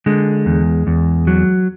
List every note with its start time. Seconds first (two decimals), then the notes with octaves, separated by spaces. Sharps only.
0.06 D3 G#3
0.46 E2
0.87 E2
1.27 F#3